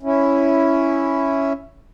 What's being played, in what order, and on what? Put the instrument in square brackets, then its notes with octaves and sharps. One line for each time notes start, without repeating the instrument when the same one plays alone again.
[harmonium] C#4 E4